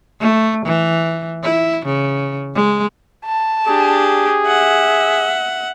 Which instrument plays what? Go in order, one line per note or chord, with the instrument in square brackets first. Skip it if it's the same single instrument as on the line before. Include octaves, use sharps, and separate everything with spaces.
[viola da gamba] A3
E3
E4
C#3
G#3
[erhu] A5
[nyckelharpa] D4 G4 [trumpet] G#4
[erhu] E5 [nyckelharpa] F#5